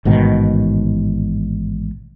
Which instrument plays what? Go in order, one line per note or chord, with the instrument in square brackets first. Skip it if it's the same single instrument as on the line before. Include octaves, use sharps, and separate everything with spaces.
[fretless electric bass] A1 G#2 B2 D#3